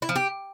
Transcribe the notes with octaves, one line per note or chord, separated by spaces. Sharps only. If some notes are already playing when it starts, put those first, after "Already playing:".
E4
F3
G4